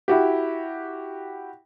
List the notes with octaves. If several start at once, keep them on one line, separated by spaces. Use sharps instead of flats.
E4 F#4 G4